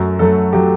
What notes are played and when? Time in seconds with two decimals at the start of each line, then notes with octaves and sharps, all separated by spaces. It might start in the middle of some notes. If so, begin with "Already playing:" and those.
Already playing: F#2 F#3 A3
0.19 F#2 F#3 A3 A4
0.53 F#3 A3 G4